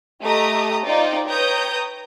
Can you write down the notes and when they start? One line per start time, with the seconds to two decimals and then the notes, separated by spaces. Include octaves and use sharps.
0.22 A3 G4 D#5 A#5 D#6
0.85 D#4 F4 C5 D5 G5
1.26 B4 C#5 G5 A#5 D#6 G6